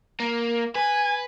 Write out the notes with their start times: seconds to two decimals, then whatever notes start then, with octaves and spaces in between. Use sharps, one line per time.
0.20 A#3
0.75 B4 G#5